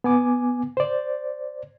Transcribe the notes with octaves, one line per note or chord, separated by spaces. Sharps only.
B3 G#5 D6
C5 D5